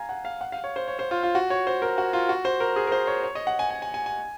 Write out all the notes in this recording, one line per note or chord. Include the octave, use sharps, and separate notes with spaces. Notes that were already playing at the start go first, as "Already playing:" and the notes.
Already playing: F5 G#5 A#5
F#5
F5
F#5
F5
C#5
C5
C#5
C5
F4
F4
F#4
C#5
C5
A#4
F#4
F4
F#4
C5
A#4
G#4
A#4
C5
C#5
C#5
D#5
F#5
G#5
G#5
G#5
G#5
G#5